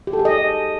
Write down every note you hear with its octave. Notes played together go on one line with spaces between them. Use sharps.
G4
A4
G#4
D#5